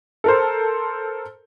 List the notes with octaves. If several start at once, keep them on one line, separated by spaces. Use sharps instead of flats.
A4 A#4 C5